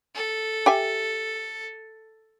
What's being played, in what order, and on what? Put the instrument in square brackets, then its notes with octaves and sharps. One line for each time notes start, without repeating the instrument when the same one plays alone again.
[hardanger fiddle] A4
[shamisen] G4 E5 G#5